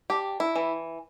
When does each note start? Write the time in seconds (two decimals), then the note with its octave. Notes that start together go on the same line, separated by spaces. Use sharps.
0.10 D4 G4
0.40 E4
0.56 E3